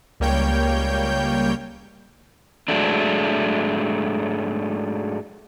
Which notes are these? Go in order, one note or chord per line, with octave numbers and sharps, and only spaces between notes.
C#2 G3 A#3 C#5 G5 G6
G#2 F#3 G#3 A3 D4